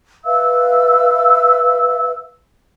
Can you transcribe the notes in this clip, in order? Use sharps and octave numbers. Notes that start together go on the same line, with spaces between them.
B4 E5 F5 E6